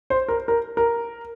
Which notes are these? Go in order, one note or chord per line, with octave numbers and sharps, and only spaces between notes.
C5
A#4
A#4
A#4